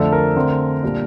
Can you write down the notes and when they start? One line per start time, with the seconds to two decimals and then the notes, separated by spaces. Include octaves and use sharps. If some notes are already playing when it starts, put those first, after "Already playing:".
Already playing: F2 D3 A3 D4 A4
0.12 A#4
0.36 D3 A3 C4
0.83 A#2 G3 D4